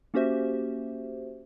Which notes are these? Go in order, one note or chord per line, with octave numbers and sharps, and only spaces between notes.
A#3 C#4 F#4 G4 C5 E5